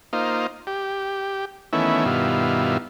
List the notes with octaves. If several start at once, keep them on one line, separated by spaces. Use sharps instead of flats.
A#3 D#4 F4 C5
G4
D#3 E3 A3 B3 C#4 E4
G2 B2 D#3 E4 F4